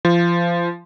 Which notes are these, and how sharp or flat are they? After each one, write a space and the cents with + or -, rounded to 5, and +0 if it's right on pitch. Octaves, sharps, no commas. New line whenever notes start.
F3 -25